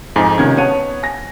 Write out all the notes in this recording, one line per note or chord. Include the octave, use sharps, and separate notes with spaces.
F2 G#2 D#4 G#5
C#2 C3 D#3 C#4 G#6
B3 C#5 F#5 A5 D#7
G#5 A#6